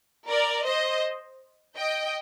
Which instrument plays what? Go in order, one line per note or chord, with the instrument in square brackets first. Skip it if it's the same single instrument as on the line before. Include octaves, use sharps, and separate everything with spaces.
[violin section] A#4 D5
C5 D#5
D#5 G5